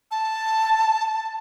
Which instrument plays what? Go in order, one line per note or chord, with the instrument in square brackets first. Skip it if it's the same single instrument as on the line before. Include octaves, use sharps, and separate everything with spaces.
[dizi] A5